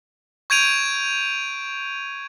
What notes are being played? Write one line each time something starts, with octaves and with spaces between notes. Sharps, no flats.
C#6 G6 G#6 D7 D#7 F7